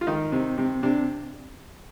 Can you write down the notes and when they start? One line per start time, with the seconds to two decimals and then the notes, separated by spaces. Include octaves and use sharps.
0.01 F4
0.07 D#3 D#4
0.32 C3
0.58 C3
0.83 C3 D4